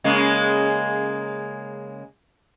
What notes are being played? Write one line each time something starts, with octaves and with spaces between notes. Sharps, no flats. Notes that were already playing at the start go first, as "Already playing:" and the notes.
C#3 G#3 A#3